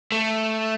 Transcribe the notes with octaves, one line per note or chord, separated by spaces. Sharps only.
A3